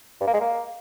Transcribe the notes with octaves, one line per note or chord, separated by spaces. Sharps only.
G2
A#3
G#3
A#3